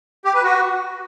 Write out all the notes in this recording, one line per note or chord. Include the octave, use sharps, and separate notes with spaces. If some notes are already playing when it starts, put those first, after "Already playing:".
G4
B4
F#4